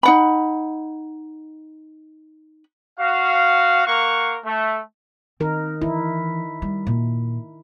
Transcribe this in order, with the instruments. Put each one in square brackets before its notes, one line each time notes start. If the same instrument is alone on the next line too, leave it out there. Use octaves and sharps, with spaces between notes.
[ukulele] D#4 F#5 B5
[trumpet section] F#4 F5
A#3 A#4 F5 F#5 C#6
A3
[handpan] D#3 D#4 A#4 [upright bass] C4
[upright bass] E3 [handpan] E4
[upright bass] G3
A#2